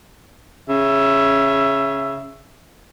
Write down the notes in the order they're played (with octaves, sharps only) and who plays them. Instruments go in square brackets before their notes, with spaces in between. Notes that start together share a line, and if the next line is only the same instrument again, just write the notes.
[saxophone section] C#3 E5